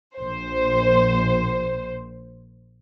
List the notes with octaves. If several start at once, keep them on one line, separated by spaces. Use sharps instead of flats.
A#1 C5